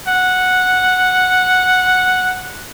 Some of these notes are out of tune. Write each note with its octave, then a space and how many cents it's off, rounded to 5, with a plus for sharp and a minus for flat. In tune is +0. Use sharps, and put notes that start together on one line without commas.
F#5 -5